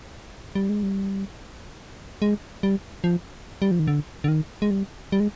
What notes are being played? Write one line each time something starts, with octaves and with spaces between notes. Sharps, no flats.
G3
G#3
G3
G#3
G3
F3
G3
F3
D#3
D3
D3
D#3
G#3
G3
G3
G#3